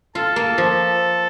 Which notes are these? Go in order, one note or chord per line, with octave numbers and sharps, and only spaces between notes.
F4 A4
A#3
F3